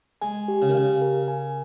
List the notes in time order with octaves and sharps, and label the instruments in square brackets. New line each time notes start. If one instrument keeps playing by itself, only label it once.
[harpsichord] G#3 [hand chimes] G#5
[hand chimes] G4
[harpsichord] C#3
D#3
[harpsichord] C#3 [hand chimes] F5
[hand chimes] A#4
G#5